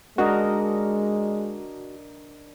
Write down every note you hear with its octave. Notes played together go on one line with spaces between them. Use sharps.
G#3 D4 F#4 A#4 D#5